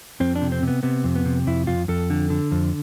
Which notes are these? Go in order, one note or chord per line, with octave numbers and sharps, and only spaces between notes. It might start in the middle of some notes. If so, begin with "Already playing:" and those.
F2 C4
D4
C3
C4
C3 B3
C3 B3
F2
B3
C3
F2 E4
F2 F4
F2 A4
D3
D3
F2